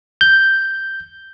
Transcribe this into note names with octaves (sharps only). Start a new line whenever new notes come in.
G6